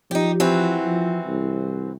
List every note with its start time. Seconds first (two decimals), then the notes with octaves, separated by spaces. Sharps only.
0.11 F3 D#4 G4
0.40 E3 C4 F#4
0.85 F3
1.27 C2